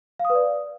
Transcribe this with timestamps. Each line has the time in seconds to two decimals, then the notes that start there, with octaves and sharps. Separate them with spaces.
0.20 F5
0.25 D#6
0.30 B4
0.35 D5